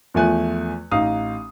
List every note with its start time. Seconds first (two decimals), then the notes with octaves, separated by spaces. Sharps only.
0.14 E2 F3 A3 G#5 F#6
0.91 A1 D#4 F5 D#6